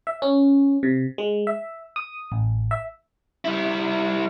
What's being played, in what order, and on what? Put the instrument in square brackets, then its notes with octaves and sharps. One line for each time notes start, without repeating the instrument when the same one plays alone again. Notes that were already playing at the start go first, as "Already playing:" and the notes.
[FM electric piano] E5
C#4
C3
G#3
E5
D#6
A1
E5
[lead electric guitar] G3 E4